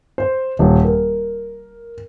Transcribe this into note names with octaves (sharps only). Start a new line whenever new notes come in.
C5
D#1
A#4